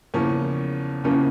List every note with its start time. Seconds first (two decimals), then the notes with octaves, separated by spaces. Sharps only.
0.14 E2 C#3 F3 A#3 C#4
1.04 E2 C#3 F3 A#3 C#4